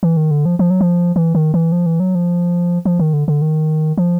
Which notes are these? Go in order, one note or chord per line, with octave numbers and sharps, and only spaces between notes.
E3
D#3
D3
F3
F3
F#3
F3
E3
D#3
E3
F3
E3
F#3
F3
F3
D#3
D3
D3
D#3
F3